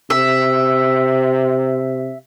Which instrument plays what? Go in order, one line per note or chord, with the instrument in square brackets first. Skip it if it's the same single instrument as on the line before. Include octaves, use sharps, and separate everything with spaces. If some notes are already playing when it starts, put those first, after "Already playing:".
[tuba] C3 [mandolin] E5